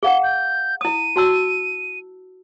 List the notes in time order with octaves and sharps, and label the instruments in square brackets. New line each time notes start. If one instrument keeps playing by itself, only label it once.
[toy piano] G#4 F5 F#5 [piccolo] G7
[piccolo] G6
[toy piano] E4 D#6 [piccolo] D#7
[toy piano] F#4 A5 E6